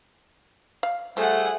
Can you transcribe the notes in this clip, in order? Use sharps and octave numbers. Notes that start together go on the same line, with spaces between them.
F5
F3 G3 A3 G#4 F#5